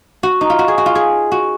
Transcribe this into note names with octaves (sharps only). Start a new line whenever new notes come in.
F#4
D#4
F4
F#4
G#4
F#4
F4
G#4
F#4